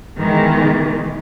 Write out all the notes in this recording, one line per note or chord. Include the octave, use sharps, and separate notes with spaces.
B2 D#3 E3 G#3